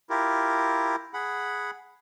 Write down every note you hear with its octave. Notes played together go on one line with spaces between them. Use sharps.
E4 F4 G4 A#4
G#4 F#5 B5